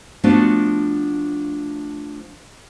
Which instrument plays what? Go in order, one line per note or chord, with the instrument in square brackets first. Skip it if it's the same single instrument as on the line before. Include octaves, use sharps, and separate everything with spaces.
[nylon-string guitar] F3 A3 B3 D4 F#4